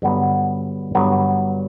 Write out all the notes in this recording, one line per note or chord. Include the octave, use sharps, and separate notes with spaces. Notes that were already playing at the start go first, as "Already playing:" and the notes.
G2 D3 F#3 B3
G2 D3 F#3 B3